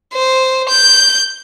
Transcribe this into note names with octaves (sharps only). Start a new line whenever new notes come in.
C5
G6